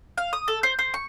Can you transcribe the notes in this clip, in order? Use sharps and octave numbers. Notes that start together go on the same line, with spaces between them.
F5
D#6
A4
C5
C5
C#6